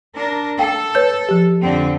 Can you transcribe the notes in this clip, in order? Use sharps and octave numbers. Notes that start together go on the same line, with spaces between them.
D4 A#4
A4 F5 G5
B4 C#5 G6
F3 G4
F2 D3 C4